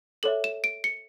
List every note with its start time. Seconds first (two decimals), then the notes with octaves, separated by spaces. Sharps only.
0.23 A4 C#5 E5 F#7
0.44 E7
0.64 D7
0.84 C#7